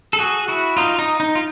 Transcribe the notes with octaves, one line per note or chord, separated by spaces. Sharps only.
A4
F#4 G#4
E4 F#4
D#4 F4
D#4
D#4
F4